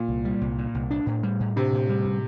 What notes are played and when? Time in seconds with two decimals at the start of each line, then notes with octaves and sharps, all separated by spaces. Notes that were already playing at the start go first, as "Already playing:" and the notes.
Already playing: A#2
0.08 C2
0.25 G3
0.41 C2
0.58 A#2
0.74 C2
0.91 D4
1.06 A2
1.23 G3
1.40 A2
1.56 C3 D4
1.73 A2
1.89 G3
2.05 A2